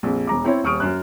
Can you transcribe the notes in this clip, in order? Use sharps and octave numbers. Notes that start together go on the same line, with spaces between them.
A#1 F2
E1 A#5 D6
C4 E4 C#5
D#1 C#6 D#6 F6 D7
F#2 F#6